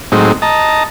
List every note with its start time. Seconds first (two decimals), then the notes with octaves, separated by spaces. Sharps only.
0.12 A2 F#3 G#3 C4 D#4
0.42 D#5 A5 A#5